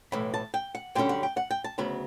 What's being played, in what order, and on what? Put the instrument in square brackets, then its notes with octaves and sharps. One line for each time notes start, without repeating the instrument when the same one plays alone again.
[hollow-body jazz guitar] B1 A2 E3 B5
A5
G5
F#5
F#2 D3 G3 C#4 G5
F#5
G5
F#5
G5
A5
D2 C#3 F#3 B3 B5